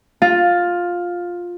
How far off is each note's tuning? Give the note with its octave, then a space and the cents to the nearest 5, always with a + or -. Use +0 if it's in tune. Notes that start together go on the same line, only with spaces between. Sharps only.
F4 +10